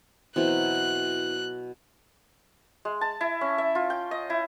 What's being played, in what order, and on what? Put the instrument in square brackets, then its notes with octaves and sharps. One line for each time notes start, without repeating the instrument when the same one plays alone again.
[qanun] B2 F#3 E4 [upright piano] E3 C4 [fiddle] F#6
[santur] G#3
A5
E4
C#4
E5
F4
G5
D#5
E4